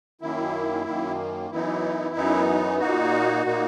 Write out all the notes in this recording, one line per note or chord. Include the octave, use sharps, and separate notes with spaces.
F#2 D#3 A#3 E4
F#2 D#3 A#3
F#2 E3 B3 D#4 E4
F#2 E3 B3 D#4
A#2 A#3 D#4 F#4
A#2 A#3 D#4